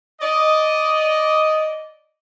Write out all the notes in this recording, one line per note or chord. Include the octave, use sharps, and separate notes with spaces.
D5 D#5